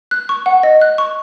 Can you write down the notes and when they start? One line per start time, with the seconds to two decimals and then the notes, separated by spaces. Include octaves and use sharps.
0.11 F#6
0.29 C#6
0.46 F#5
0.63 D#5
0.81 F#6
0.98 C#6